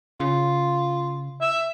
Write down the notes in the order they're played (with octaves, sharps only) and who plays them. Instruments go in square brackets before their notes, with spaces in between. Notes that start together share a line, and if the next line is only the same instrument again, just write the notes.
[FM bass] C#3 [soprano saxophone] F4
[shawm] E5